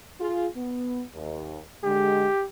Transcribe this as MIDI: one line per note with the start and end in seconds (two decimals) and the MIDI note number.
0.20 0.47 65
0.20 0.47 68
0.56 1.03 59
1.14 1.61 39
1.84 2.27 50
1.84 2.27 56
1.84 2.45 67